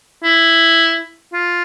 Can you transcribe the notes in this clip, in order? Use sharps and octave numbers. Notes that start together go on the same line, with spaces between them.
E4
F4